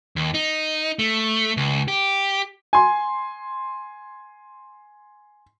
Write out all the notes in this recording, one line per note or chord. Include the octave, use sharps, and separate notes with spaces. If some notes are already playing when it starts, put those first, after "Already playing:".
D#2
D#4
A3
C#2
G4
G#5 C6